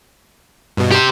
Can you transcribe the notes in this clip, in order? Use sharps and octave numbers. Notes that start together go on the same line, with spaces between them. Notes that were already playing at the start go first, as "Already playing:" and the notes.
G2 B2
G4 C5